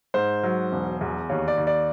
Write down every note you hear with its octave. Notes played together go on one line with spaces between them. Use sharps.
G#2 C5
F#3
E1
E2
D#2 C#5
D5
D#2
D5